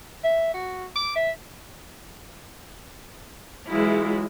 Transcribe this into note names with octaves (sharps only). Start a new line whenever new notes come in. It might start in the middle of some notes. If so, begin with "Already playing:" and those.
E5
F#4
D6
E5
E3 F#3 G#3 E4 F4